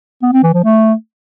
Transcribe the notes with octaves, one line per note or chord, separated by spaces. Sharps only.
B3
C4
E3
F3
A3